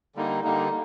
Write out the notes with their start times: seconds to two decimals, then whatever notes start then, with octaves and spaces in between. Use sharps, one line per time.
0.15 D3 G3 A#3 D#4
0.44 D3 G3 A#3 D#4